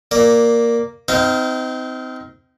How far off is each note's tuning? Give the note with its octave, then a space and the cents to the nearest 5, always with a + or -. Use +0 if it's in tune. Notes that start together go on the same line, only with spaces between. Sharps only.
A#3 +0 D5 +0
C4 -30 D#4 +20 F5 -10